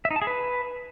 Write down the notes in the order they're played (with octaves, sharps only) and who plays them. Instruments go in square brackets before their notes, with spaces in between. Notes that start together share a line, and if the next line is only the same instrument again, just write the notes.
[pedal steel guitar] E5
D#4
A5
G#4
B4